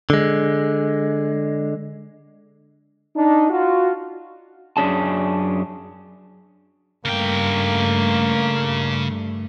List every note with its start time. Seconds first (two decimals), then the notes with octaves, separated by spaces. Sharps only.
0.10 D3 G#3
3.15 D4 D#4
3.50 F4 F#4
4.77 F#2 C#4 D4 G#4 A5
7.05 G2 C#3 A3 A#3 G5